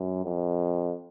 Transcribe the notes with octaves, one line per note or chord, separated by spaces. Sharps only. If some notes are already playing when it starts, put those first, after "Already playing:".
Already playing: F#2
F2